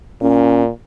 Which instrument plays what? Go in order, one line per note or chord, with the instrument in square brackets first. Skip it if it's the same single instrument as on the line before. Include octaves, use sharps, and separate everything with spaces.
[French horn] A#2 [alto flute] C#4